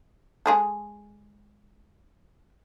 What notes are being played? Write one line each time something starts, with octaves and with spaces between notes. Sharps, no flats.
G#3 G#4 A4